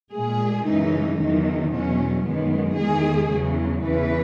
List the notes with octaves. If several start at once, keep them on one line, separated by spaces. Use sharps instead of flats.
A#2 G#3 G#4
F#2 C#3 E3 G#3 D#4
E2 D#3 F#3 D#4
E2 B2 F#3 C#4
F#2 D#3 G#3 B3
E2 D#3 G#3 G#4
E2 C#3 F#3
E2 C#3 E3 B4